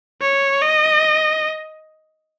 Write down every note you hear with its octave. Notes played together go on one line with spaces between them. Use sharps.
C#5
D#5